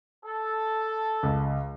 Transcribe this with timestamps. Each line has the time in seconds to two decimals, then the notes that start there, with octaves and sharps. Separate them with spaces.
0.24 A4
1.23 C#2